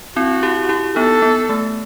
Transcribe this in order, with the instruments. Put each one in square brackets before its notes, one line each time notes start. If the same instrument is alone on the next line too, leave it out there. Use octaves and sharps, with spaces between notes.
[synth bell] C4 E4 [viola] F#4
[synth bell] E4 G4
E4 G4
[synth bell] B3 D#4 [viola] A4
[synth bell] B3
A3